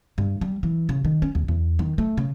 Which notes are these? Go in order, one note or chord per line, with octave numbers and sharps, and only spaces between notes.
G2
G3
E3
C#3
D#3
C#4
D#2
E2
D#3
A3
C#3